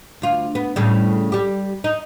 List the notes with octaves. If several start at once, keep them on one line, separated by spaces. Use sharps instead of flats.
D2 F4
B3
A2 C#3 G3
G3 G4
D#4